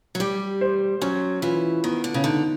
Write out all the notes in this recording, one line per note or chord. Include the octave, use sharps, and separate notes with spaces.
F#3
G3 G4
C5
F#3 C#4
E3 F4
D#3 B3
D3
C#3
D3 D#4